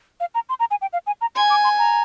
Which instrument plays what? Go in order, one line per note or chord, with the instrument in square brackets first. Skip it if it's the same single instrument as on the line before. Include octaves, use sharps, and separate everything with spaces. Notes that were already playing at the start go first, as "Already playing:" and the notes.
[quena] F5
A#5
C6
A#5
G#5
G5
F5
G#5
A#5
[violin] G#5 [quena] C6
[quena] D6
C6
A#5